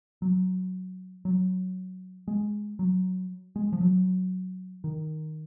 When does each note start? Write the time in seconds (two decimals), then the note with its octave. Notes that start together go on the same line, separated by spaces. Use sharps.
0.22 F#3
1.25 F#3
2.28 G#3
2.79 F#3
3.56 G#3
3.73 F3
3.81 F#3
4.84 D#3